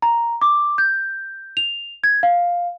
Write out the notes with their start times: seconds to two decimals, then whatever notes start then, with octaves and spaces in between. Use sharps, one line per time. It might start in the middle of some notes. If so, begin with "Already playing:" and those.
0.02 A#5
0.42 D6
0.78 G6
1.57 F7
2.04 G#6
2.23 F5